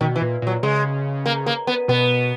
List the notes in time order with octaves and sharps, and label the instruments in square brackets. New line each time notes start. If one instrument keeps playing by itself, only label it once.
[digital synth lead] B2 [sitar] D#3
[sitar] E3
[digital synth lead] A#2
[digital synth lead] A#2 [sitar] F#3
[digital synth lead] C#3 [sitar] G#3
[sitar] A#3
A#3
B3
[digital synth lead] B2 [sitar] B3